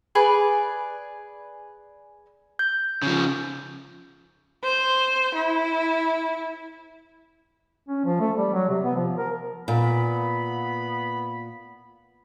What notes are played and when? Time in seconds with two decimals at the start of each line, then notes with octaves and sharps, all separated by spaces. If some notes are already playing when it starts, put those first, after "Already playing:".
0.15 G#4 B4 D5
2.59 G6
3.02 C#3 F3
4.63 C5
5.35 E4
7.89 C#4
8.05 F3
8.20 A3
8.37 G3
8.54 F#3
8.69 C3
8.84 B3
8.96 F3
9.18 A#4
9.68 A#2 B3 B5